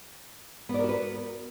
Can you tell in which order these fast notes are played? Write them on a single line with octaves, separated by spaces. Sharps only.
B3 D5 A#4 F#4 B4